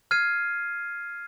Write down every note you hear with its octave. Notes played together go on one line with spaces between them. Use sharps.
F6 G#6 C7 D#7